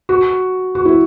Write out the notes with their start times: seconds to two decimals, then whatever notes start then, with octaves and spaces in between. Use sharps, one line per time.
0.09 F#4
0.75 F#4
0.85 E4